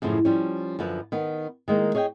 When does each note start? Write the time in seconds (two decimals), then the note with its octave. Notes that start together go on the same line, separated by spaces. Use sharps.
0.02 F#2 A2 C#3 F3
0.25 F3 G3 C#4
0.79 F#2 D3 F3 B4
1.12 D#3 B3
1.68 D#3 G#3 A#3
1.95 G#4 C#5 D#5 F5 G5